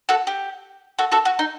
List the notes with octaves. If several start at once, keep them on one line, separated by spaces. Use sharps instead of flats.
F#4 A4
G4
F#4 A4
F#4 A4
F#4
D#4